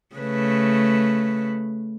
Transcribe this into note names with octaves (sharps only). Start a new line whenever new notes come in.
C#3 A3 B4